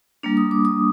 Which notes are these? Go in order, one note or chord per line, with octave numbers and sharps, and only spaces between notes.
G3 A#3 D4
D#6
D6
D#6